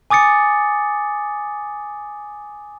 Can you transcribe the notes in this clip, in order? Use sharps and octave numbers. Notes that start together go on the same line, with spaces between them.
G#5 D6 D#6 A6 C#7